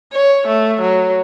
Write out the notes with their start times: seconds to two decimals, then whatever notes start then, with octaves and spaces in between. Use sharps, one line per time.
0.13 C#5
0.47 A3
0.81 F#3